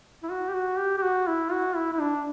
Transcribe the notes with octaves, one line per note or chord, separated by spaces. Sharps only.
E4
F#4
G4
F#4
G4
G4
F#4
E4
F#4
E4
E4
D4